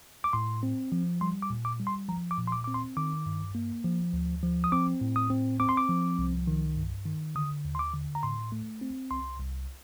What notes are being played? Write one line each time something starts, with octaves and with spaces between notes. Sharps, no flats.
D6
A2 C6
C4
F3
G3 C6
D6
A#2
D6
G3
C6
F3 A#5
D6
A#2
C6
D6
C4 D6
C6
D#3 D6
G2
A#3
F3
D2
F3
D#6
C4 D6
A2
D#6
C4
C4 D6
C6
D6
F3
C2
D#3
G2
D#3
D3 D#6
D#2
C6
D6
D3
A#5
A2 C6
A3
C4
C2 C6
C2